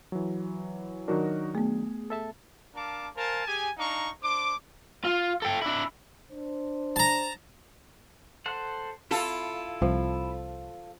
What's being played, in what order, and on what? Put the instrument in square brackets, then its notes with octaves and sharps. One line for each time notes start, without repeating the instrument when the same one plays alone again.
[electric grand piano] E3 F#3
[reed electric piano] D#3 F#3 D4 [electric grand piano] D#4 F#4 A#4
[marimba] A3 B3 [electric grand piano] G#4
[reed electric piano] A4 E5 A5
[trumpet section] D4 A#4 F5 A5 D6
A#4 C5 F5 G#5 A5
G4 G#4 G#5
D4 D#4 F5 A#5 C#6
D4 C5 D6
[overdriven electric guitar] F4
A4 G5
D4 E4
[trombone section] D4 C5
[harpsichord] A5 A#5
[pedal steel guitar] A4 C5 F#5
[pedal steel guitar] E4 [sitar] F4 A4
[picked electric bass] C2 [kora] F3